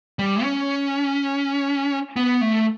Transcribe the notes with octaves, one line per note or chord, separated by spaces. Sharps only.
G3
C#4
B3
A3